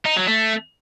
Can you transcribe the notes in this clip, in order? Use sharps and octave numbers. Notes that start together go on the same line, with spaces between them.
D#4
F#3
A3